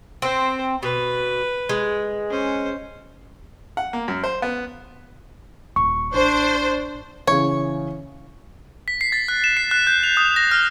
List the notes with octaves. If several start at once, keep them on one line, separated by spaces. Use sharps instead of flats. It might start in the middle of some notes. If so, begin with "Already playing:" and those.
C4 C5
B2 B4
G#3
C#4 C5
F#5
A#3
F#2
C5
B3
D#1 C#6
A1 D4 C5
C#3 E3 C#5
B6
C7
A6
F#6
E7
C7
F#6
G6
F7
D#6
A#6
F6